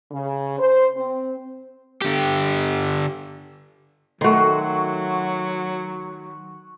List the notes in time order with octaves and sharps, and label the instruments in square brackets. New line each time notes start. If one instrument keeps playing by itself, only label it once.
[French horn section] C#3
C5
C4
[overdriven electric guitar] D3 G4
[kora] D#3 A3 [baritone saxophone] F#3 [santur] F#4 C6